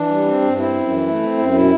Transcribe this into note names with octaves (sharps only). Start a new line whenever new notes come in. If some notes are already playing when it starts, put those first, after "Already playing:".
Already playing: E3 D4
G3
C4
G2
C4 E4
F#2
E3
A3
C4
F#2
B2 E4